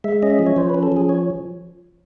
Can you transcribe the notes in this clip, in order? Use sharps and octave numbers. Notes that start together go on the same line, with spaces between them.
G#3 E5
C#4 D#5
E5
F3
C#5
F3 C5
B4
C#4
A4
F3 G#4
C#5